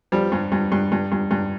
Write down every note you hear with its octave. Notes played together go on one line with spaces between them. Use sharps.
F3 G3
G2
G2
G2
G2
G2
G2